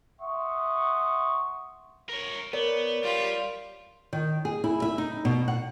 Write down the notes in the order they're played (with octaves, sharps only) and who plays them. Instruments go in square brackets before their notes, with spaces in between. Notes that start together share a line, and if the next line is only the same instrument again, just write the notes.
[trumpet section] E5 F#5 C6 C#6 D#6
[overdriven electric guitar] A#4 C#5
[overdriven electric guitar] B3 [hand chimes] A#4 C#5 D5
[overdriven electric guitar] G3 G4 [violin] F4
[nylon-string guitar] D#3
G#4
E4
E5
D#4
B2
F#5